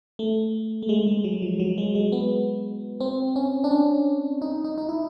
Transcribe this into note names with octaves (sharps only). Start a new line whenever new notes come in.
A3
A3
G#3
G#3
F#3
F3
F#3
G#3
G#3
B3
C4
C#4
D4
C#4
D#4
D#4
D#4
E4